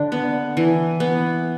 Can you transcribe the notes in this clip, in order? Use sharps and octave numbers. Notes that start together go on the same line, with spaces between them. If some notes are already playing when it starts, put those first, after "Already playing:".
Already playing: D3 D4
B3
E3
B3